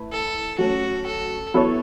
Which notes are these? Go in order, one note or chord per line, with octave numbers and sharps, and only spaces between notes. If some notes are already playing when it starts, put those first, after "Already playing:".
Already playing: A3 E4 B4
A4
F#3 A3 C#4 F#4
A4
F#3 B3 E4 A4 C#5